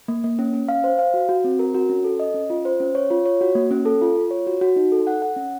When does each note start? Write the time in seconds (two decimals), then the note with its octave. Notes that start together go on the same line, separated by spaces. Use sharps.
0.08 A#3
0.24 A#3
0.39 C#4
0.53 C#4
0.68 F5
0.84 C5
0.99 F5
1.14 F#4
1.29 F#4
1.44 C4
1.59 A#4
1.74 F#4
1.89 C#4
2.04 A4
2.20 D#5
2.34 C#4
2.50 F4
2.65 C5
2.80 C#4
2.95 C#5
3.10 F4
3.26 C#5
3.41 F#4
3.55 A#3
3.71 C#4
3.85 A4
4.01 F4
4.17 F4
4.31 C#5
4.47 F#4
4.61 F#4
4.76 D#4
4.92 A4
5.07 F#5
5.22 F#5
5.36 C#4